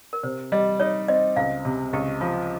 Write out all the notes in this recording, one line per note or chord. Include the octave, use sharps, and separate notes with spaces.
A#4
C3 C5
G3 D#5
D#4 C#5
C4 D#5
C#2 F5
C3
C#2 G4
F3 F4